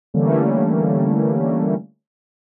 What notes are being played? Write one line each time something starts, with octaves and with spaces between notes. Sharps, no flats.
D3 E3 G3 A3 A#3 C#4